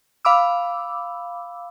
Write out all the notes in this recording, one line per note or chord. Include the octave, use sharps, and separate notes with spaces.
F5 B5 D6 E6